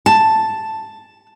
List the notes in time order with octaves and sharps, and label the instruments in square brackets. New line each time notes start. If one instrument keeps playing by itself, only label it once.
[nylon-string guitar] A5